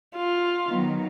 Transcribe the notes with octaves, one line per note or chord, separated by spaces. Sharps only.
F4
D#3 F#3 B3 D#4